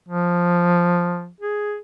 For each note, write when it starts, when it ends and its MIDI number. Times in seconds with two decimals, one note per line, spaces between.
0.09 1.29 53
1.41 1.78 68